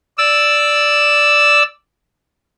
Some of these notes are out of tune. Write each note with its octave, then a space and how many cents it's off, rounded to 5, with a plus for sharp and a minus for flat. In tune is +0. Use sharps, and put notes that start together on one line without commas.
D5 +0 E6 +0